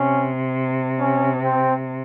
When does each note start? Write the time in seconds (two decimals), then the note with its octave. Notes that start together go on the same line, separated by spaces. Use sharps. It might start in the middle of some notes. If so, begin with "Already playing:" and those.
Already playing: C3 C#4
1.00 C#4
1.43 C4